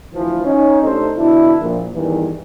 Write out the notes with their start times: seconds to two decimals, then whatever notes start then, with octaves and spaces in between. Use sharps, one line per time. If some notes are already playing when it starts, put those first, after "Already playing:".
0.14 D2 E3 F3
0.45 C#4 D#4
0.83 C3 A3 D4 D#4 A4 C5
1.17 B2 D3 D4 E4
1.60 A#1 A#2
1.93 E2 G2 D#3 E3